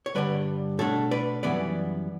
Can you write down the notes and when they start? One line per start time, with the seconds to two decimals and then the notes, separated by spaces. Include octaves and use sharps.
0.06 C#5
0.15 G2 D3 G3 B4 D5
0.79 B2 A3 D4 A4 C#5
1.11 B4 D5
1.43 F#2 E3 G3 B3 B4 D5